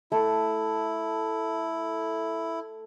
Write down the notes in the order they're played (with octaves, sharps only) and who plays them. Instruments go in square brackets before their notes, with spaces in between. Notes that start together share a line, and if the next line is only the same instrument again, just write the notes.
[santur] A3 [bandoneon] E4